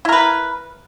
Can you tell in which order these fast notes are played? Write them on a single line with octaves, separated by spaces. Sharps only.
E4 A#4 B4